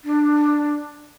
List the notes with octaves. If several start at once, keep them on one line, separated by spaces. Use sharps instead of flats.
D4